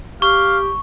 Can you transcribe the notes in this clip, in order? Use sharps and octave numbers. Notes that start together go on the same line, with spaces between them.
G4 F5 C#6